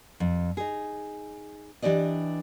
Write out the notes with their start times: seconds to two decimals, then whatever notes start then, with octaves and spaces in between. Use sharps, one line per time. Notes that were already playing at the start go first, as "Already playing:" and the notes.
0.20 F2
0.57 D#4 G#4
1.82 E3 D4 G4 D5 D#5